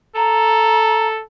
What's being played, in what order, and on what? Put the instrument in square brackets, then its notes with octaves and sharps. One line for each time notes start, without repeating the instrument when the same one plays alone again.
[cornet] A4 [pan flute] A#5